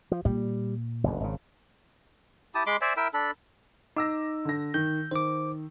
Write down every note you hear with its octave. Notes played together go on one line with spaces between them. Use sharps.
F3
A#2 G3
F#1 D2
G#1 C#3
E4 G4 A5 D#6
G#3 B5 C6 D6
C5 D5 E5 G#5
E4 A#4 E5 G5
D4 A4 B5
D#4 D6 E6 A#6
D3 A#6
D#3 G6
D#3 C5 D6